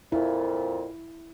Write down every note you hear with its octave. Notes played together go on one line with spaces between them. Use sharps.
F2 A#2 E4